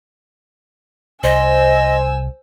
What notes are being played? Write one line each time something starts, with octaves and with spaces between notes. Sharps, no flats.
C2 C5 D#5 G#5 E6